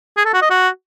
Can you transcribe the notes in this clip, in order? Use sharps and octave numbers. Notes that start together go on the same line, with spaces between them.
G#4
A4
F#4
D#5
F#4